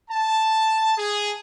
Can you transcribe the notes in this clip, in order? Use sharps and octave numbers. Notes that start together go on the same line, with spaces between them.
A5
G#4